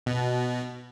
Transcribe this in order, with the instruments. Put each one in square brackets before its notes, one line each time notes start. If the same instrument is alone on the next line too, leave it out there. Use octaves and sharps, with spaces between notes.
[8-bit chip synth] B2